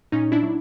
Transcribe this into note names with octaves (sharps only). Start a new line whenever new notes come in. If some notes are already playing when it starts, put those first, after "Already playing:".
A#2 C#4 D#4
D4 E4
F#3